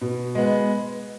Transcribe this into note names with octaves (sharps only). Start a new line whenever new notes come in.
B2
G#3 B3